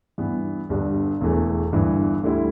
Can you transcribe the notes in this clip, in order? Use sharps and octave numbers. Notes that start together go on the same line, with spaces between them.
G2 E3 B3
G1 G2 G3 D4
E1 E2 E3 A3
G1 G2 E3
D2 D3 G3 E4